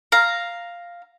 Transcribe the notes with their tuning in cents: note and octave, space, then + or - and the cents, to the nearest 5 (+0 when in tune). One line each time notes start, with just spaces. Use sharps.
F5 +0 A#5 +0